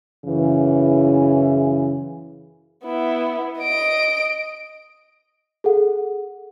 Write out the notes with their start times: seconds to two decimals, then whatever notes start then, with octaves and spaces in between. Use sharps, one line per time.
0.25 F#2 C#3 E3
2.86 B3 E4
3.61 D#5 D7
5.64 G#4 A4 F#5